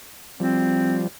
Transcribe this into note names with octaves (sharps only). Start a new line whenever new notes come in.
F3 G3 C4